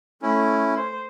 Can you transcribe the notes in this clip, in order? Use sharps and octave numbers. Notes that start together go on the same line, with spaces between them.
A3 C#4 E4
C5